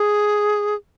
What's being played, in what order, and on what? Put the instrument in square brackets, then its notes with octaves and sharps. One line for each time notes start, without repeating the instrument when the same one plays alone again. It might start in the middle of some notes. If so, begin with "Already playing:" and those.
Already playing: [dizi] G#4